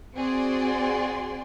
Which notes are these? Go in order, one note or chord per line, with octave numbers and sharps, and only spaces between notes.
C4 F#4 G#4 D5 C6